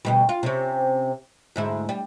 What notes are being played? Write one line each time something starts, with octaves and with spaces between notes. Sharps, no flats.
D2 B2 G3
F4
C3 C#4
D2 G#2 E4
G3